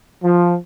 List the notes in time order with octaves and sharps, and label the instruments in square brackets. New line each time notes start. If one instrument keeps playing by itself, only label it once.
[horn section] F3